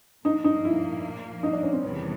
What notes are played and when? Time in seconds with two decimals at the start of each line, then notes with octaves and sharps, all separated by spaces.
0.25 A#2 F3 A#3 D#4
0.44 D#4
0.65 E4
1.43 D#4
1.53 D4
1.63 C#4
1.72 C4
1.82 E2 C3 D#3 G3 B3 C#4